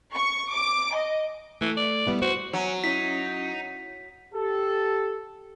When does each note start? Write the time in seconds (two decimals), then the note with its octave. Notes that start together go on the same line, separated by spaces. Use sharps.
0.14 C#6
0.51 D6
0.95 D#5
1.61 E3 A3
1.77 D5
2.07 G3 B3 E4
2.22 F#4 C5
2.53 F#3 C#4
2.84 C#4 D#4 E4 B6
4.34 G4 A4